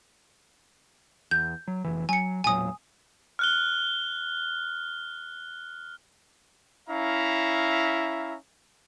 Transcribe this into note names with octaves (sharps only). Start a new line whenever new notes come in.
E2 G6
F#3
F1 E3
F#3 G#5 C#7
E1 A#2 F#3 G#5 D#6
F6 F#6 G7
C#4 E4 E5 F5 A#5